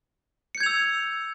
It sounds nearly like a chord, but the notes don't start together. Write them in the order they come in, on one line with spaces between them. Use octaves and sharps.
C#7 G6 G#6 F7 E6